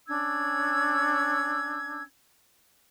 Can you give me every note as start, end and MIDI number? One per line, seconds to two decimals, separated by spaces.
0.07 2.03 61
0.07 2.03 62
0.07 2.03 88
0.07 2.03 92